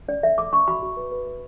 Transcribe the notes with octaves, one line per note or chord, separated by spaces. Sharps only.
C#4 D5
A4 E5
A4 D6
C#4 C#6
F#4 B5
F#4
B4
B4
B4